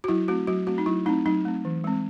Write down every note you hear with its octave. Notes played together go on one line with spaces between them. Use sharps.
F#4
F#3 E4
A3 C4 F#4
F#3 F#4
A3 C4 F#4
D#4
F#3 E4
A3 C4 D#4
F#3 D#4
A3 C4
E3
G#3 C4